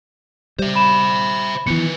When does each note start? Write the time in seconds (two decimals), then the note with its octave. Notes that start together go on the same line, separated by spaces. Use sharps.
0.59 G3 C5 E5
0.75 B5 E7
1.67 D#3 E3 B3 B4 C#7